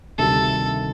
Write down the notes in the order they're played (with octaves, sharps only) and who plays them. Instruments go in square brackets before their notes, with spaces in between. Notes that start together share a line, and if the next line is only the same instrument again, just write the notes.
[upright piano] D2 C3 D#3 G3 [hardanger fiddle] A4